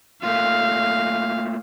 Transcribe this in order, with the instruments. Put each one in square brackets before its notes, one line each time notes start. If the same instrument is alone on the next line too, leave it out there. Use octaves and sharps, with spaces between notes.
[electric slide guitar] A3 A#3 F4 [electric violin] F5